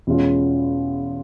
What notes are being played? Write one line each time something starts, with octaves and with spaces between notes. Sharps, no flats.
E2 B2 G#3 C#4 F4